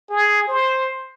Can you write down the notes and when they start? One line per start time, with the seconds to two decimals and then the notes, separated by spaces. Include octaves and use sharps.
0.10 G#4
0.48 C5